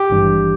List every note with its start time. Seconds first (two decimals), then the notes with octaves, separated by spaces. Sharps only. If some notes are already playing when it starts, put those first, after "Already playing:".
Already playing: G4
0.10 G#1 G2 E3